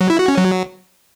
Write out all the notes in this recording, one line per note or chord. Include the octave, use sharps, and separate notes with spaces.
F#3
E4
F#4
C#4
F#3